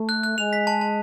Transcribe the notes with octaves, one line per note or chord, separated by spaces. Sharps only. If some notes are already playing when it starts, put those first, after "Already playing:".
Already playing: A3
F#6
F#6
G#3 F7
B6
A5
A5